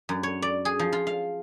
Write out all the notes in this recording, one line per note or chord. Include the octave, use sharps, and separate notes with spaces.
F#2
C#5
D5
G#4
F3
F4
F5